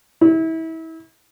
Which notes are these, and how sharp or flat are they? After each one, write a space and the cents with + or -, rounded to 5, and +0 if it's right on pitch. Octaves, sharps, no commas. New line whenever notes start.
E4 -30